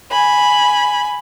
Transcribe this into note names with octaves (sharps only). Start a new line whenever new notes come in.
G#5 B5